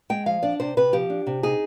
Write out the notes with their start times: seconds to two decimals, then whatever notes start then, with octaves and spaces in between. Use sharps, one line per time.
0.10 G#3 G5
0.26 F3 F5
0.43 D4 D5
0.60 C3 C5
0.77 C3 B4
0.93 F3 G4
1.10 D4
1.27 C3
1.43 D#4 G#4